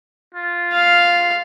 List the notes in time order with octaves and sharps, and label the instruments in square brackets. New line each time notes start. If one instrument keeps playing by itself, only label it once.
[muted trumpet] F4
[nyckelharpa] F5